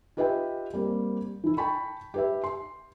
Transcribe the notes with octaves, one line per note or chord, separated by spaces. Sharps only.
F4 G4 B4 D#5 E5 G5
G3 A#3 C4
E3 E4
G5 A5 B5 C#6
G4 B4 E5
C6